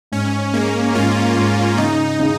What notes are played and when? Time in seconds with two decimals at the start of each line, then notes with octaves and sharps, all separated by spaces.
0.12 G#2 C#4
0.54 G#3 A#3
0.95 G#2 F4
1.37 G#2
1.78 C#3 D#4
2.20 C#3